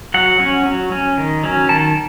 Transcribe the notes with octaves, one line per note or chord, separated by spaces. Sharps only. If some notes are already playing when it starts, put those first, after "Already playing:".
F#3 F#5
C#4
F#3
C#4
D#3
F#3 C#4
D#3 A5